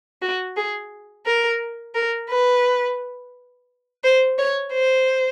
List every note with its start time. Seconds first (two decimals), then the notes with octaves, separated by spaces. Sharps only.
0.22 F#4
0.56 G#4
1.26 A#4
1.95 A#4
2.30 B4
4.04 C5
4.38 C#5
4.74 C5